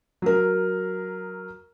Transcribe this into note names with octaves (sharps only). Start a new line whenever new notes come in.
F#3 A#4